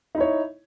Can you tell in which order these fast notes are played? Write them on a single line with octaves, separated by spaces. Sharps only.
D#4 E4 C#5